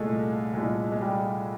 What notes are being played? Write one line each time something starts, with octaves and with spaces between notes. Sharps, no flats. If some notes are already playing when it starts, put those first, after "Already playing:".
Already playing: C2 A#2 G#3 A3
C2 A#2 G#3
G#3
G3